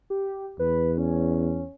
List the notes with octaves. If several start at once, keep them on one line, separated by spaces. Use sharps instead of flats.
G4
E2 B4
C#4